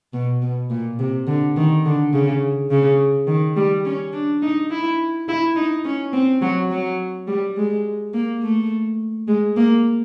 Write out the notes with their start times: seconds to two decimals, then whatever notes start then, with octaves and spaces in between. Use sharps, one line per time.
0.13 B2
0.42 B2
0.70 A#2
0.99 C3
1.27 D3
1.57 D#3
1.85 D3
2.13 C#3
2.70 C#3
3.27 D#3
3.56 G3
3.85 C#4
4.13 D4
4.42 D#4
4.71 E4
5.28 E4
5.56 D#4
5.85 C#4
6.13 C4
6.41 F#3
6.71 F#3
7.28 G3
7.57 G#3
8.14 A#3
8.42 A3
9.28 G#3
9.56 A#3